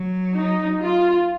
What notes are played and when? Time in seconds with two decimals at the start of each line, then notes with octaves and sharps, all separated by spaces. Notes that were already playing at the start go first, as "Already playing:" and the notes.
Already playing: F#3
0.35 D#4
0.81 F4